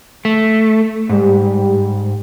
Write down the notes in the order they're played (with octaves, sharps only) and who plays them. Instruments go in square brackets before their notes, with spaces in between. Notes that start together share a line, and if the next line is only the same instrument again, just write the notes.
[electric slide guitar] A3
[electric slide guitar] G#2 [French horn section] G3